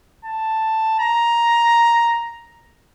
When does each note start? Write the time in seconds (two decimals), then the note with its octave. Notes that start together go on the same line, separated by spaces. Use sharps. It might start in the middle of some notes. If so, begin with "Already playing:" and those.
0.25 A5
0.99 A#5